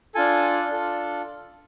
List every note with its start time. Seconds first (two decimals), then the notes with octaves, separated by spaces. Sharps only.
0.15 D4 F4 A4 G#5
0.68 D4 F4 A4